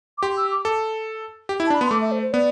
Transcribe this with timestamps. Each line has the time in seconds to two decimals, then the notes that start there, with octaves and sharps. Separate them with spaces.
0.18 D6
0.23 G4 C6
0.37 E6
0.51 D6
0.65 A4
1.49 G4
1.60 E4
1.67 A5
1.70 D4
1.74 B5
1.81 B3 C6
1.91 A3 D6
2.01 E5
2.12 C5
2.22 C5
2.33 B3 D5